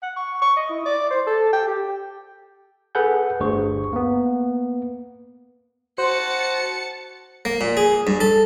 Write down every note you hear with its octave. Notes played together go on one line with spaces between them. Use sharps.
F#5
C#6
C#6
D#5
E4
D5
C5
A4
G5
G4
G#4 A4 B4 F#5 G#5 G6
G1 D2 G2 G#4 C5 C#6
A#3 B3
F#4 C5 A5 C#7
A#3
A#2
G#4
G2
A4